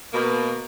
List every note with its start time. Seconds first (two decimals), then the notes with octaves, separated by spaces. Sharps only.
0.12 B2 A#3